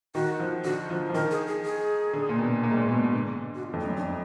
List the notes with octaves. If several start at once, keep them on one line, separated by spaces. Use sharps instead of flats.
D#3 F#4
F3
D3 F#4
F3
F3
D#3 A#4
G#4
G#4
G#4
D3
A#2
B2
A#2
G#2
A#2
B2
B2
D3
F#4
F4
F2
D#4
F#2
D4